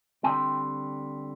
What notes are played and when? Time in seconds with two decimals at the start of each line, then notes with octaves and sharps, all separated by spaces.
0.24 D3 G3 C4 G5